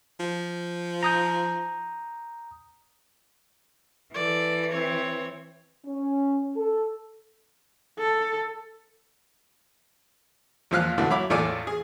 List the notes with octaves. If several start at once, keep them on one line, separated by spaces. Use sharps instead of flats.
F3
A#5 D#6 G6
E3 A4 D5
C4 C#5
C#4
A4
A4
E2 A#2 F3 F5 F6 F#6
B2 D3 E3 A3
F#3 E4 B5 D6
E2 A2 F4 A4 D5 G#5
G#4